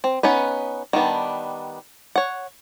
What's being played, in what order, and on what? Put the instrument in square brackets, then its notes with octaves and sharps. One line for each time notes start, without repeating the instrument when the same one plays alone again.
[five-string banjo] C4
B3 C#4 D#4 B4
D#3 G3 B3 D4
C#5 F#5